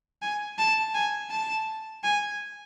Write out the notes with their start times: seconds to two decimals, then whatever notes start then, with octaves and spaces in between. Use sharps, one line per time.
0.22 G#5
0.59 A5
0.94 G#5
1.31 A5
2.04 G#5